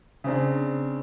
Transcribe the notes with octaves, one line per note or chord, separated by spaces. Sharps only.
C#3 C4 D4